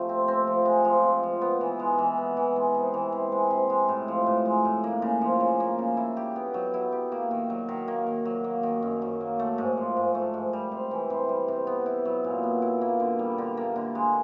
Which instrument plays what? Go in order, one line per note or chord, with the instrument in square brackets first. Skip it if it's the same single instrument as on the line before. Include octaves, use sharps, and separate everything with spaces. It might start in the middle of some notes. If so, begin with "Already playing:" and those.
Already playing: [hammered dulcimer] C3 F3 A3
C4
C4
F3
G#3
F3
C4
F3
B3
E3
G#3
E3
B3
E3
G#3
C3
E3
C3
G#3
C3
G#3
A2
F3
A2
G#3
A2
A#3
C#3
F3
C#3
A#3
C#3
E4
G4
B3
F#3
E4
G4
A#3
D#3
F#3
D#3
A#3
D#3
F#3
A#3
D#3
F#2
F#3
A#3
A3
G#2
F3
G#2
A3
G#2
G3
C3
E3
C3
G3
C3
B3
E4
F#3
A#2
B3
E4
A#3
D3
G3
D3
A#3
D3
G#3